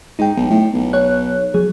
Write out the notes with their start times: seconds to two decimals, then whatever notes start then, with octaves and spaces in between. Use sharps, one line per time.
0.19 G#2 D#4 G5
0.37 B1
0.50 A2
0.74 B1
0.93 C#5 F#6
1.54 F#3 G#4